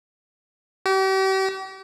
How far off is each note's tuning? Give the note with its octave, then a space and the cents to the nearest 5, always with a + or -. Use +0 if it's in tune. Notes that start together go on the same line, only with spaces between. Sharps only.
G4 -40